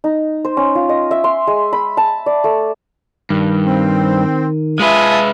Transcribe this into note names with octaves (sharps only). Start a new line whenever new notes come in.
D#4
C5
C#4
F4
D#5
E5
C6
G#3
B5
A5
D5
A3
G2 D#3
C4
G#3 F4 B4 E5 G#5 A5 D#6